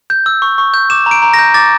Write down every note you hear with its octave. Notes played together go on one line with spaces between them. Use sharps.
G6
E6
C#6
C#6
G6
D6 E7
A#5
D7
A#5
A#6
G6
D6 A6